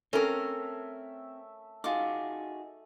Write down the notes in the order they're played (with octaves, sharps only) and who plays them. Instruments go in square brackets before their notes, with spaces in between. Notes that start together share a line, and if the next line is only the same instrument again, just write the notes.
[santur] A3 E5 E6 [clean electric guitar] C4 [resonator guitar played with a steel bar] C#4 A#4 [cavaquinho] A4
[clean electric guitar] D#4 F#4 G#4 [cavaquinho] F4 D6